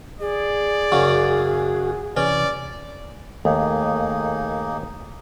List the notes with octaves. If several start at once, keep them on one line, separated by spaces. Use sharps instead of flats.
G#4 D5
F#2 C#3 F#4
C3 E3 C#4 D5
D#2 A3 A#3 D#4 G#4